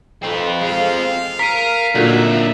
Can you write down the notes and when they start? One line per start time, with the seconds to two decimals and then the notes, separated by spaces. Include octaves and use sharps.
0.23 C4 D#4 F4 A4 B4
0.61 G#3 F5
1.39 A#4 B6 D#7
1.95 A#2 D3 F#3 A#3 D4 D#4 E5